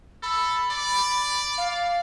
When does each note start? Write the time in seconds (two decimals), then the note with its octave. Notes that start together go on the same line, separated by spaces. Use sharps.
0.22 A4 B5
0.71 D5
1.57 F5